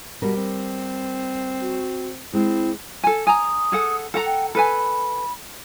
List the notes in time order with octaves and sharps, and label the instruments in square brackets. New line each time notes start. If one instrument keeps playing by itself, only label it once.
[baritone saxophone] B2 [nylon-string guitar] G3 A#4
[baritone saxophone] C4
[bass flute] F#4
[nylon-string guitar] G#3 [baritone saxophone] C4 [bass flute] E4
[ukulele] A4 G#5
[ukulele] G#5 A#5 [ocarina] D#6
[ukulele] G#4 A4 F#5
A4 F#5 A#5
[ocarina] G5
[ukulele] A4 B4 G#5 [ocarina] B5